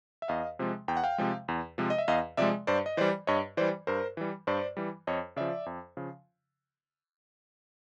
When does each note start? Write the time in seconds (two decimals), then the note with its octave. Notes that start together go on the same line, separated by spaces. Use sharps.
0.22 E5
0.28 E2 D#5 F5
0.59 C3 F3 G#3
0.88 E2 G5
0.97 F#5
1.04 F5 G5
1.18 C3 F3 G#3
1.48 E2
1.78 C3 F3 G#3
1.90 D#5
1.98 E5
2.08 E2 D#5 F5
2.37 C3 F3 G#3 D5 E5
2.67 G2 C5 D5
2.86 D#5
2.97 E3 G3 C5 D5
3.27 G2 C#5 D#5
3.57 E3 G3 C5 D5
3.87 G2 A#4 C5
4.17 E3 G3
4.47 G2 C5 D5
4.77 E3 G3
5.07 F2 C#5 D#5
5.36 C#3 F3 D5 E5
5.66 F2
5.97 C#3 F3